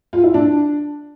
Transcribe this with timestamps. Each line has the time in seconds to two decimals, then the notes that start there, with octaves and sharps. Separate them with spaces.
0.13 F4
0.24 E4
0.34 D4